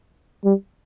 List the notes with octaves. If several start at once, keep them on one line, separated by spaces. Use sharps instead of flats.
G3